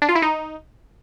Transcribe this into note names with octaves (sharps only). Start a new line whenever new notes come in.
D4
F4
E4
D#4